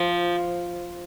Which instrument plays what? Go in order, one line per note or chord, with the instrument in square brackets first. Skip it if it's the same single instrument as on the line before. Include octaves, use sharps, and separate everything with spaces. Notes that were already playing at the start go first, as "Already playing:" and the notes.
Already playing: [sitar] F3